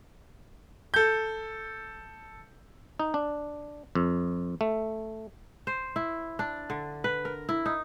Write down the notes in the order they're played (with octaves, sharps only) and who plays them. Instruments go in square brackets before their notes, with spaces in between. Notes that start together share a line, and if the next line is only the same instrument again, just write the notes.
[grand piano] A4 G6
[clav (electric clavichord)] D#4
D4
F2
A3
[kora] C5
E4
D4
D3
B4
A#4
E4
D#4